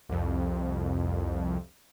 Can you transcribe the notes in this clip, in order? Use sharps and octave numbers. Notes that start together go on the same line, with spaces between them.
C2 F2